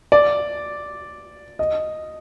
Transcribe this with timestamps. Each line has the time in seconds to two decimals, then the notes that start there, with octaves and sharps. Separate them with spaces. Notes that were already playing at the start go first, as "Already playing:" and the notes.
0.12 D5
1.59 D#5